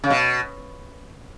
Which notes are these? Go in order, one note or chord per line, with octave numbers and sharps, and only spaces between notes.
C#3
B2